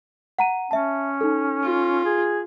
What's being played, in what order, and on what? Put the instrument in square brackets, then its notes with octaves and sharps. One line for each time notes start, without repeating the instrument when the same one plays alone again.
[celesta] F#5 A#5 D#7
[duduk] C#4 [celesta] E5 A5
[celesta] D#4 A4
[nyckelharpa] F4
[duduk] G#4